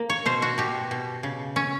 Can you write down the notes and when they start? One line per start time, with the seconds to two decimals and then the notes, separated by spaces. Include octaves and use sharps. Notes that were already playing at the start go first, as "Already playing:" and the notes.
Already playing: A#3
0.10 C#5
0.26 B2 C5
0.42 F#4
0.58 B2 G4
0.91 B2
1.23 C#3
1.56 C#4